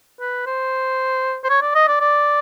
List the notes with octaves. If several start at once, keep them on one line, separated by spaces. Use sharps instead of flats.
B4
C5
C5
C#5
D5
D#5
D5
D5